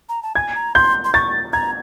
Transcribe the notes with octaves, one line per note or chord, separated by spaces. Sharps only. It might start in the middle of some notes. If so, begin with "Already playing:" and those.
A#5
A5
G#5 G#6
A#5
C6 G6
C6
C#6 A6
A#5 G#6